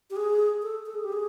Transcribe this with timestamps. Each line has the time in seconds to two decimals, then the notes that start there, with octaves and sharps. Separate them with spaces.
0.10 G4
0.16 G#4
0.63 A4
0.86 A4
0.95 G#4
1.04 G4
1.12 G#4